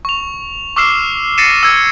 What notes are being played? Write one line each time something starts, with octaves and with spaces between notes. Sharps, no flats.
C#6 F7
C#6 D6 E6 F6 C7 E7
A6 A#6 C7 C#7 D#7 E7
E6 G#6